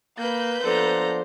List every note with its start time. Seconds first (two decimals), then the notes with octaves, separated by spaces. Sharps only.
0.18 A#3 B4 G6
0.63 F3 B3 D4 A4 C5 A#5